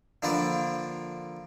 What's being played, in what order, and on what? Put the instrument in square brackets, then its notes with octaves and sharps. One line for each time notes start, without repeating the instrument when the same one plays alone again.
[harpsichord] D3 F3 A#3 D4 A#4 B4